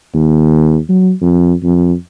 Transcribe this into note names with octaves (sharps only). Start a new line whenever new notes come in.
D#2
F#3
F2
F2